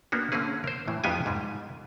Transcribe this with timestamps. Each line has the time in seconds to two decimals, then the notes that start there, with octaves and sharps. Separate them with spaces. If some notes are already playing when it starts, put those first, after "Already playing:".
0.12 A#3 B3 D4 F#4
0.32 D3 A#3 C4 C#4 G#4
0.64 A#4 C5
0.88 A2 E3
1.04 F2 B3 F4 G4 G5 G#5
1.26 G#2 G3